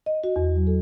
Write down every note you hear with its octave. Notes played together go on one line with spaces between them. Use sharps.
D#5
F#4
E2
F#3
A4